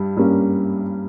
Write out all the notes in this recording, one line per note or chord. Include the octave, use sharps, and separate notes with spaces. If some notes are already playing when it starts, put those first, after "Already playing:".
Already playing: G2 G3
G2 G3 A#3 C#4